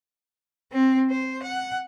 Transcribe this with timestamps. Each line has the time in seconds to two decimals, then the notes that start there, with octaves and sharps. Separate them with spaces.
0.73 C4
1.11 C5
1.43 F#5